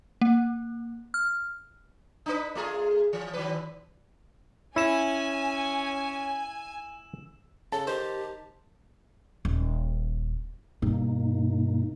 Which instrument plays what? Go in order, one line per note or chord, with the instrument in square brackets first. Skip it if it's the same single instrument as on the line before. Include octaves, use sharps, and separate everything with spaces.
[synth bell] A#3
F6
[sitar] D4 D#4 B4
A3 F4 G#4
E3
D#3 F#3 B4
[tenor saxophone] C#4 [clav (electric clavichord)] E4 [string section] G#5 [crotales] E6 E7
[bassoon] C#3 [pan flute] A4 [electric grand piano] A5
[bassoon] D#3 [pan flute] G4 [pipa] C5
[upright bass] D#1
[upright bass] G2 [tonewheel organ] B2 A#3 D#4